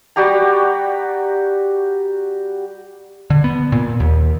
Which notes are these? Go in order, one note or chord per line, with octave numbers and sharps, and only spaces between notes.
G3 F#4 G4 A#5
D3
B3
A#2
D#2